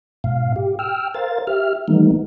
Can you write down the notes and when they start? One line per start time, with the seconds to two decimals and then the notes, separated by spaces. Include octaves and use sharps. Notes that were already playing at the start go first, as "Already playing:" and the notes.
0.24 G#2 B2 F5
0.56 G4
0.79 G5 E6 F6
1.14 A#4 C5 F5 A6
1.47 G4 E5 F6
1.88 D#3 E3 G3 A3 B3 D#4